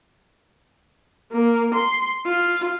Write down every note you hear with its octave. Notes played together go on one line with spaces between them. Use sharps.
A#3
C6
F4